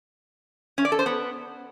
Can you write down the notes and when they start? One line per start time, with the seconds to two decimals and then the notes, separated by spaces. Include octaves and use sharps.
0.78 C#4
0.85 D5
0.92 A4
0.99 C5
1.06 B3